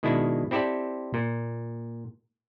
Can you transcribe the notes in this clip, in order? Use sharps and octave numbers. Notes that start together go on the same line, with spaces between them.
B2 D#3 G#3 D4 E4
C4 E4 G4 A4 C5 D5
A#2